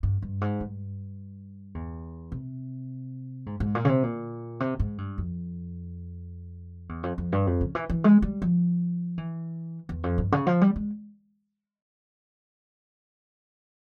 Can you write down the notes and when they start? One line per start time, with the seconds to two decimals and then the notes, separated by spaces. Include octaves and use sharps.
0.03 G2
0.22 G2
0.41 G#2
0.60 G2
1.75 E2
2.32 C3
3.46 G#2
3.60 G#2
3.75 A#2
3.85 C#3
3.89 C3
4.03 A#2
4.60 C3
4.79 G#2
4.98 G2
5.18 F2
6.89 E2
7.03 F2
7.18 F2
7.32 G2
7.47 F2
7.61 C#3
7.75 E3
7.90 E3
8.04 G#3
8.22 G3
8.42 F3
9.18 E3
9.89 E2
10.04 F2
10.18 G2
10.32 C#3
10.47 F3
10.61 G3
10.76 G#3